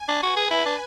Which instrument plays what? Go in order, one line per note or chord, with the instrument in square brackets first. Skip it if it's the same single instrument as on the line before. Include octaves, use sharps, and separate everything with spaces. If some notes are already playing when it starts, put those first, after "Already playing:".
Already playing: [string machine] G#5
[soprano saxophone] D4
[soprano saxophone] F#4 [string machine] B4
[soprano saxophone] G#4
E4
D4